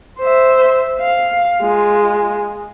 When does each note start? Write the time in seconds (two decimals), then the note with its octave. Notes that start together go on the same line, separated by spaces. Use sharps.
0.19 C5 E5
1.00 F5
1.62 G#3 F4